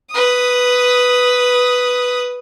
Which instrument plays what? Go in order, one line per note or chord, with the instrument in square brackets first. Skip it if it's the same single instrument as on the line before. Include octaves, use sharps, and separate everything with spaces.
[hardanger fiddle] B4 D#6